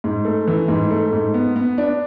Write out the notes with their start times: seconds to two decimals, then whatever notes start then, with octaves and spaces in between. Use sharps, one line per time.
0.04 G#2
0.25 A3
0.47 E3
0.68 G#2
0.91 A3
1.13 G#2
1.34 B3
1.56 B3
1.78 D4